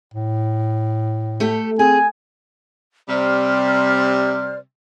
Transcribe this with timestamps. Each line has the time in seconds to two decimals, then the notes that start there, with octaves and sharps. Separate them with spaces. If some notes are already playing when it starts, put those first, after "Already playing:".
0.14 A2
1.40 A3 G4 A4
1.79 C4 G#4 G#5
3.09 C3 G3 C5 D5 F6